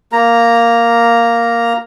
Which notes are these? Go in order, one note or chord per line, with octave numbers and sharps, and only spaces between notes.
A#3 A#5